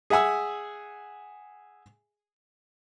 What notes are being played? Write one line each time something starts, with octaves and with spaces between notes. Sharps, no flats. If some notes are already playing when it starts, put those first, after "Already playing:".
G#4 E5 F#5 G#5 E6